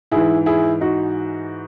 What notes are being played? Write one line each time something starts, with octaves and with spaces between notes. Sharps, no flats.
G#2 E3 E4 G#4
E4 G#4
D#4 F#4